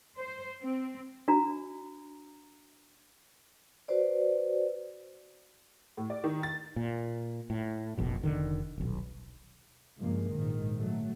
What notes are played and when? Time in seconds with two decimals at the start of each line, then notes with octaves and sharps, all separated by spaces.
0.18 C5
0.62 C4
1.28 D4 F#4 A#5
3.88 F#4 B4 C5 D5
5.97 A2
6.10 D5
6.24 D#3
6.43 A6
6.76 A#2
7.50 A2
7.98 F1 A#1 B2
8.24 F1 D3 D#3
8.78 D#1 B1
9.98 G2 C#3 F3 G#3 A#3
10.31 A#1 G#2 D#3
10.79 F#3 A3